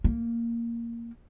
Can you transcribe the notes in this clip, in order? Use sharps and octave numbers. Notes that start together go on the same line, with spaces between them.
A#3